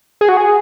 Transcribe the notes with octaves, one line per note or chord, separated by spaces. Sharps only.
G#4
F#4
G#4